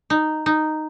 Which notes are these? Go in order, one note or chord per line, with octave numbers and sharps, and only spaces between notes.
D#4
D#4